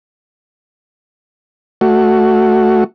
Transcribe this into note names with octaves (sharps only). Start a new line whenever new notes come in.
A3 F#4